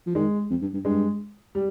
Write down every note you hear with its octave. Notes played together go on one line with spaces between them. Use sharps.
F3
D#3 G#3
F2
G2
G2
G2 G#3
G3